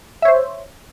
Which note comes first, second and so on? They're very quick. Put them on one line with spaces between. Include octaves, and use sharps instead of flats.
E5 C#5 C5